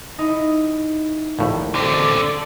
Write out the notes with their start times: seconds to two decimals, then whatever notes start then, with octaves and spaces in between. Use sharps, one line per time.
0.18 D#4 E4
1.39 A#1 D#2 A2
1.75 D3 C4 A4 D5